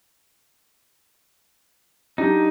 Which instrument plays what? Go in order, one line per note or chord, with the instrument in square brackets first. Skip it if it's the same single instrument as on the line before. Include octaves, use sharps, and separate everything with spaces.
[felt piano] F#3 D4 G4 [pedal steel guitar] D#4